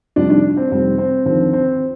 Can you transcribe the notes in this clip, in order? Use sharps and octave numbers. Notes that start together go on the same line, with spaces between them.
F1 F2 D#3 G3 D4
D4
C4
F1 F2 D#3 G3 C4
C4
D#2 D3 F3 C4
C4